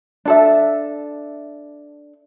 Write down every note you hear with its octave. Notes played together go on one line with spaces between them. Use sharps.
D4 A4 E5